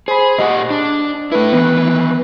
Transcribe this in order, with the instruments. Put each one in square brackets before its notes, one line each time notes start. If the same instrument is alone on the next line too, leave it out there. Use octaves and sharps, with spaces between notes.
[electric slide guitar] G#4 [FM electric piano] C5 B5
[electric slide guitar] A#2 G4 F#5 [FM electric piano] D#5
[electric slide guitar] D4
[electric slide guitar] A3 E4 [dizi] B4
[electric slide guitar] D#3 E3 [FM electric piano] B3